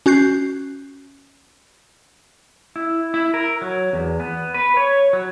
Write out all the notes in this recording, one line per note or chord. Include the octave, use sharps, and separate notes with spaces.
C#4 F#4 F#6 G6 C7
E4
E4
A#4
F#3
E2
B3
B4
C#5
F#3